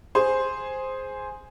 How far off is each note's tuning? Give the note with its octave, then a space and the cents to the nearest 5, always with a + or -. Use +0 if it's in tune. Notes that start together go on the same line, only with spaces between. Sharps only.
G#4 +0 C5 +0